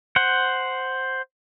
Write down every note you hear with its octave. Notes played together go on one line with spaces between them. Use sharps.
C5 F#5